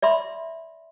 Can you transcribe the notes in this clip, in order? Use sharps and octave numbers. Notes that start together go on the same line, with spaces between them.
D5 E5 B5 C6